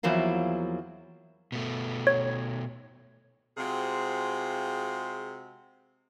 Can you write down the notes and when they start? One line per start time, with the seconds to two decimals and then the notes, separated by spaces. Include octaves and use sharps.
0.03 E2 F3 F#3 A#3 E4
1.52 B2 A3
2.07 C#5
3.58 C3 G#3 C4 F4 F#4 G#4